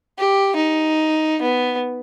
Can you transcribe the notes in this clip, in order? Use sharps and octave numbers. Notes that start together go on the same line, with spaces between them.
G4
D#4
B3